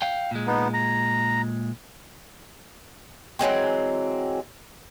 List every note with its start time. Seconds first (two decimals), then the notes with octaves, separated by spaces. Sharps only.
0.02 F5 G5
0.31 A#2 G#3
0.47 B3 D#4
0.74 A#5
3.39 E3 F#3 G#3 C4